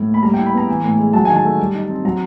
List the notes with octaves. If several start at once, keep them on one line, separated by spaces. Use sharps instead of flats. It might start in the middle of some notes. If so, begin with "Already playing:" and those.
Already playing: A2
A#3
B5
G3 A#5
G5
E4
B5
B3 A#5
E3
A2
G#3
F#3 A5
D#3 G#5
A5
A3
G3
D#4
C4
F#3 A#5